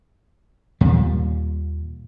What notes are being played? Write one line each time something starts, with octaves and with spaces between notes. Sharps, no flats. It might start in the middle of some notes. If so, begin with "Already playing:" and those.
D#2 A#2 G3